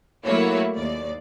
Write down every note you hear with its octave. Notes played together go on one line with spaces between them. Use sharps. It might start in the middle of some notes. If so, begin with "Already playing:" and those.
F#3 A3 A#3 E4 F#4 C#5
D#2 D5